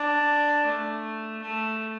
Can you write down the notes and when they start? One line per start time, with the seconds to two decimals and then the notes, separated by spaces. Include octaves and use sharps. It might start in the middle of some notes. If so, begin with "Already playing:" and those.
Already playing: D4
0.66 A3
1.42 A3